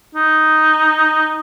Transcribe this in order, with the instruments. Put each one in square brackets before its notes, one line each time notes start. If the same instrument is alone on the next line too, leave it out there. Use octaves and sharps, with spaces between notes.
[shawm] D#4